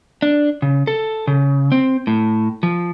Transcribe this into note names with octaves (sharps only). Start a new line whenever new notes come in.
D4
C#3
A4
C#3
C4
A2
F3